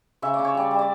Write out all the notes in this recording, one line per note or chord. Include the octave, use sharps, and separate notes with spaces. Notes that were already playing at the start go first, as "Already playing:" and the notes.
C#3 E5
C#3 D5
C#5
G3 D5
G3
D5